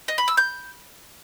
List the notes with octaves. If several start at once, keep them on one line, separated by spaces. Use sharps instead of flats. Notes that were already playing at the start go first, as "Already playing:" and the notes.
D#5
B5
E6
G6